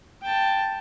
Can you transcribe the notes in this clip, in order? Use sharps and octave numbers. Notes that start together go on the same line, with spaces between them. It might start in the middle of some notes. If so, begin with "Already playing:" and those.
G5 A5